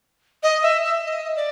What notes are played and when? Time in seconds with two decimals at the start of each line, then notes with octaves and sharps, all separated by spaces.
0.43 D#5
0.63 E5
0.84 E5
1.06 D#5
1.36 D5